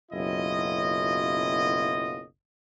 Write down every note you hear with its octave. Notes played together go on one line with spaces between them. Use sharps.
F#1 B1 F#2 E4 F4 D#5